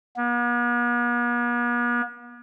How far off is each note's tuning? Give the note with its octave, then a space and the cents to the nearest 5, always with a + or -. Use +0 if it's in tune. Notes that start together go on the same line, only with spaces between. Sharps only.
B3 -45